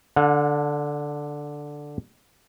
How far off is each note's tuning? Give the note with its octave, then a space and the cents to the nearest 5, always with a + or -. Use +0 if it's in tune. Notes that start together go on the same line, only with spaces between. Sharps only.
D3 +0 F#5 -45